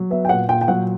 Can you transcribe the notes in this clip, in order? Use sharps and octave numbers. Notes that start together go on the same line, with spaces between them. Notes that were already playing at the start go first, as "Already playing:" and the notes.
Already playing: F#3
B3 E5
G5
A#2 F#5
A#2 G5
G5
F#3 F#5